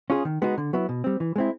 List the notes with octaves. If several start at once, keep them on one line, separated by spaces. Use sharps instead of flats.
C#4 F4 G#4
D#3
G#3 B3 D#4 F#4
D3
F#3 B3 E4
B2
G3 C4
E3
G#3 C4 E4